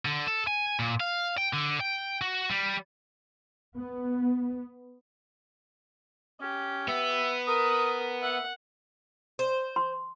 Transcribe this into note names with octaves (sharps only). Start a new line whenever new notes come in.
D3
A4
G#5
A#2
F5
G5
D3
G5
F#4
G3
B3
C#4 G4
B3 E5
A#4 D#6
E5 F#5
C5
C6